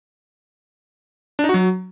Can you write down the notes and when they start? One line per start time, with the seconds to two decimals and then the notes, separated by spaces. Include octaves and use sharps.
1.39 D4
1.44 D#4
1.49 F#4
1.54 F#3